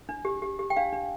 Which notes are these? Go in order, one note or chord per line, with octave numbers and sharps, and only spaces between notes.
D4
G4
G4
G4
G5
D4 F5
D4